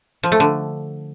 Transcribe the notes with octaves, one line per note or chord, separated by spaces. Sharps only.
F3
A3
D3